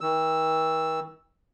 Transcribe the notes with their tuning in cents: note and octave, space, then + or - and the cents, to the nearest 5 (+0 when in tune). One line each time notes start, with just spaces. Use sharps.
D#3 +45 E6 +0